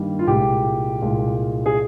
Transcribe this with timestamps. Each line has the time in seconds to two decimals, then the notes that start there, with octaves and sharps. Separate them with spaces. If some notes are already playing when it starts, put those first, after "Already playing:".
Already playing: G2 D#3 G3 A#3
0.19 F4
0.27 C2 A#2 G#3 G4
1.01 C2 A#2 G#3
1.66 G#4